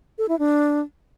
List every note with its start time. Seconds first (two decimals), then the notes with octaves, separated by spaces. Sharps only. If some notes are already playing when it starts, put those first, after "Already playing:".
0.18 A4
0.29 E4
0.39 D4